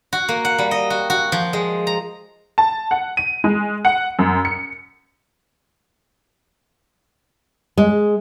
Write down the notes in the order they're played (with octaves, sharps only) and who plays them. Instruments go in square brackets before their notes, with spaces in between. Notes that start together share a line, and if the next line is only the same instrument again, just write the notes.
[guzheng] F#4
A#3
F#5
G3
D#5
F#4
F#4
F3
G#3
A#5
[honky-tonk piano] A5
F#5
D#7
G#3
F#5
F#2
C#7
[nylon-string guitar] G#3